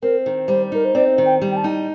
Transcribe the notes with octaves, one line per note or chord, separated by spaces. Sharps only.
C4 A#4
D#3
G3 C5
D#4 A#4
C5
C4 D5
D#3
G5
G3
G5
A5
D#4